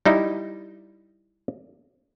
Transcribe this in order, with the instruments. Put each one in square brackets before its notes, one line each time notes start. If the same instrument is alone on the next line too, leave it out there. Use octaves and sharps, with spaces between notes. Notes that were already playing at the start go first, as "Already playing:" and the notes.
[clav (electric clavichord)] G3 D#4 E4